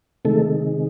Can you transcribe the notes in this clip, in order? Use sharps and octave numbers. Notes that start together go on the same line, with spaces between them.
C3 D#3 G#3 A3 A4